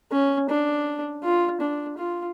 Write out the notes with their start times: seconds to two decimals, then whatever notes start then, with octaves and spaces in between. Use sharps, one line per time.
0.12 C#4
0.49 D4
1.23 F4
1.61 D4
1.98 F4